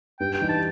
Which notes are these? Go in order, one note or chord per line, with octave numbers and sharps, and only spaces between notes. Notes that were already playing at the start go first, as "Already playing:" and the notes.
G2 G5
G5
E3 G3 D#4
A5